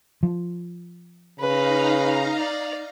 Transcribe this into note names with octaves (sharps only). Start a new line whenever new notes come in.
F3
C#3 D#4 B4 F5 A#5
D5